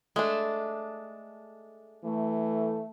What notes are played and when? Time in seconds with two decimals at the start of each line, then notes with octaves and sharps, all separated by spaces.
0.16 G#3 A3 D4
2.04 E3 A3